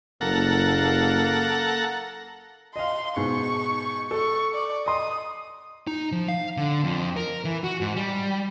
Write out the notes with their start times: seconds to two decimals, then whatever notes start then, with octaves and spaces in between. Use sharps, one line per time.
0.21 F#1 A#3 A4 F#5 A#5
2.76 D#5 F5 C6
3.16 G#2 B2 C#6
4.11 A4 C#6
4.55 D5
4.86 D#5 C6 D#6
5.87 D#4
6.12 F3
6.28 F5
6.57 D3
6.84 F2
7.16 A#4
7.45 E3
7.64 F#4
7.81 G#2
7.96 G3